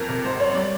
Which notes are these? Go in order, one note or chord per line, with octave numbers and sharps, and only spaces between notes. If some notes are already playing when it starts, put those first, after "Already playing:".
Already playing: F2 A#4
C3
G#1 C5
F#2 C#5
G3 D5